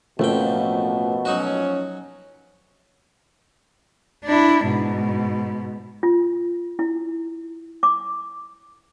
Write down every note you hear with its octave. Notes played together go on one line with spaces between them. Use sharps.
A1 F2 B2 F3 A3 A#3 G5
F#3 C#4 D#4 F#4
D4 E4
G#2 B2
F4
E4
D6